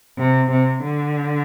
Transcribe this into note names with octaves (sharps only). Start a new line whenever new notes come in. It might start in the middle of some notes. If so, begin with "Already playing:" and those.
C3
C3
D3